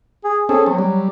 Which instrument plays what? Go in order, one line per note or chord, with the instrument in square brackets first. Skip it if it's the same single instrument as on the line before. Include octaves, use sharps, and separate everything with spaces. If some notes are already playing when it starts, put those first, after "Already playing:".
[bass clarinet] G#4
[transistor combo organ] C4 C#4 A4 [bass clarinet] G#4
[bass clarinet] F#3 [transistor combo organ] C4
[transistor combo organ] G3